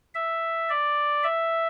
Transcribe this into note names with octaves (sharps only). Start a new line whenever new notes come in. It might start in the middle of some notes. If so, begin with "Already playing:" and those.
E5
D5
E5